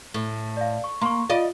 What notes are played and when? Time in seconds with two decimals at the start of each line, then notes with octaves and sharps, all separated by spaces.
0.14 A2
0.57 D5 F5
0.84 C#6
1.01 A#3 C6 C#6
1.30 F4 D5 D#5 F5